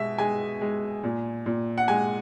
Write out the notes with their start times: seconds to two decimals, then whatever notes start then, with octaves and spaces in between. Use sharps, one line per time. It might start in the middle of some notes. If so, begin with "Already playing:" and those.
Already playing: B2 G#3 E5
0.18 G#3 G#5
0.61 G#3
1.03 A#2
1.46 A#2
1.78 F#5
1.88 G#3 G#5